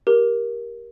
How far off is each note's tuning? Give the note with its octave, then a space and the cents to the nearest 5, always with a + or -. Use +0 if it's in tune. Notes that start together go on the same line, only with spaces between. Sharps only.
G4 +0 A#4 +15